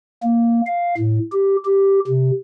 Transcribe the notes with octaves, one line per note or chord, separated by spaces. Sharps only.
A#3
F5
A2
G4
G4
C3